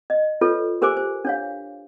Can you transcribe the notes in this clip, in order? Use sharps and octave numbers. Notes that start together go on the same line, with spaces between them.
D#5
F4 A4 B4 C#5
G4 A#4 C5 G#5 D6
C5
D4 C#5 F5